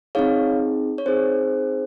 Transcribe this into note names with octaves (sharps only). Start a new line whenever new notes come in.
C4 D#4 G#4 C#5 F5
C#5
C4 D#4 G#4 C5